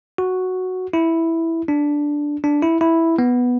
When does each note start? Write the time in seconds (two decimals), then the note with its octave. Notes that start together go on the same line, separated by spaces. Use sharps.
0.18 F#4
0.93 E4
1.68 D4
2.44 D4
2.62 E4
2.81 E4
3.19 B3